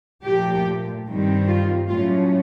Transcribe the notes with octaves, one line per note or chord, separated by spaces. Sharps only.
A#2 F3 A3 G4
G2 D#3 G3 C4
F4
A2 F#3 A3 C#4 F4